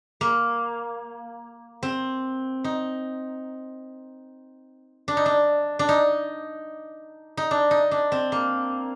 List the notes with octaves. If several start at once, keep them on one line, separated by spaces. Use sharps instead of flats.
A#3
C4
D#4
D4
D#4
D4
D4
D#4
D#4
D4
D#4
D4
C4
A#3